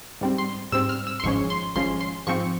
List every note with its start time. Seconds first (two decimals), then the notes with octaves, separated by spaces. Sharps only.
0.21 G#2 G3 C4
0.38 C6
0.72 G#2 G3 C4 E6
0.89 F6
1.07 E6
1.20 C6
1.24 G#1 G#2 F3 G#3 C#4 C#6
1.50 C6
1.75 G#1 G#2 F3 G#3 C#4 C6
2.01 C6
2.27 G#2 F3 C4 C#6